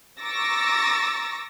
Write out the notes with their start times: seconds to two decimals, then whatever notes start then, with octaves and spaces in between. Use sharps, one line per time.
0.20 A#5 C#6 D6 E6 A6 A#6